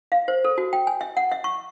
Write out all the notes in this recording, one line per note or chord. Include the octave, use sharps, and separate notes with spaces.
F5
C5
A4
F#4
G5
G#5
E5
F#5
E5
C#6